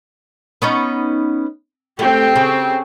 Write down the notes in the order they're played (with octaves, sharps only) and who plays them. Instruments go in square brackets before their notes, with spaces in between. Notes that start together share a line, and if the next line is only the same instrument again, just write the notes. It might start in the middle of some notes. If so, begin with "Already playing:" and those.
[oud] B3 C#4 D#4
[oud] A3 [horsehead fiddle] C4 G4
[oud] C#3